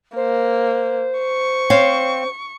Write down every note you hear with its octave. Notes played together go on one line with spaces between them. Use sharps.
A#3 C5
C#6
C4 C#5 F5